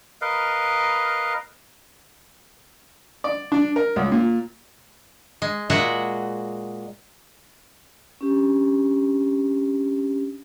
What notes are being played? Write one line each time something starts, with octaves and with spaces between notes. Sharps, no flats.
A#4 B4 D#5 F5
D5
D4
A#4
C#2
A#2
G#3
A#2 G#3 F#4 G#4 E5 F#5
C#4 D4 G4